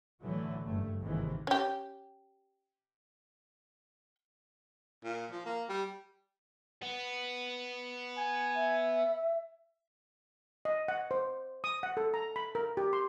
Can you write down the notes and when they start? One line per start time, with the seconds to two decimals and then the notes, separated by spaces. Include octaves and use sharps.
0.21 A2 D3 E3 F#3 A3
0.64 F#1 G2 A3
1.01 G#1 D#2 G#2 C3 D#3 E3
1.47 C#4 G4
5.04 A#2
5.31 F3
5.46 A#3
5.69 G3
6.83 B3
8.18 G#5
8.55 E5
10.65 D#5
10.88 F#5
11.11 C5
11.64 D#6
11.83 F#5
11.97 A4
12.14 A#5
12.36 B5
12.55 A#4
12.77 G4
12.93 C6